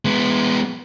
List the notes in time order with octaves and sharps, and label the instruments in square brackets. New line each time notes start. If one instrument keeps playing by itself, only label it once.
[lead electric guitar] G#3 B3